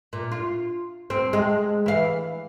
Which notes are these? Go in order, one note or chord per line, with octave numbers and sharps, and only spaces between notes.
A#2
F4
C4
G#3
E3 F5